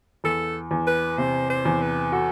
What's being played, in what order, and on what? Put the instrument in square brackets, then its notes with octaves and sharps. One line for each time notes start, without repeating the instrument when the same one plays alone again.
[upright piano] E2 [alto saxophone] A4
[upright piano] E2
[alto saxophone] B4
[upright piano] C3 [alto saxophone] C5
[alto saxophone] C5
[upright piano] E2
[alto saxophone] B4
[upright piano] F#4 [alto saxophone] A4